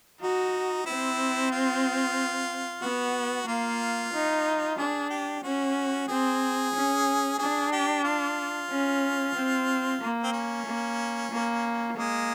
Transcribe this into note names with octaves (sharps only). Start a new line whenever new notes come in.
D#4 F#4
C4 E4
F4
B3 F#4
A#3 F4
D#4
D4 G#4
G4
C#4 F#4
C4 G#4
C#4
D4 G#4
G4
F4
C#4
C4
A#3
C4
C#4
A#3
A#3
G#3 A#3